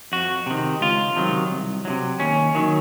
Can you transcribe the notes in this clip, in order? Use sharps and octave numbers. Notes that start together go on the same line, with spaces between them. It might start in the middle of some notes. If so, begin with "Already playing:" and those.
F2 F#4
C3 D#3
C#2 F4
C3 D#3 F#3
C2
C3 D#3 F#3
D#2 C#4
D#3 F#3